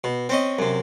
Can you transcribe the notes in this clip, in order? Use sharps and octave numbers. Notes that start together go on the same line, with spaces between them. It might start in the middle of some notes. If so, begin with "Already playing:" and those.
B2
C4 C#4 D#5
F#2 C3